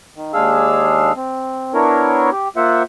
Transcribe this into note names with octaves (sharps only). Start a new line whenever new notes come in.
D#3
D#2 G#3 D4 G#4 F5 E6
C4
B3 D4 E4 A#4 C#5
G4
A#3 F4 C5 E5 F#5